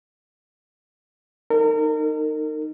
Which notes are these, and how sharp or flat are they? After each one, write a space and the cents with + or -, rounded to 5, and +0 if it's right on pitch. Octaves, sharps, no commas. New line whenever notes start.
D#4 -15 A#4 -35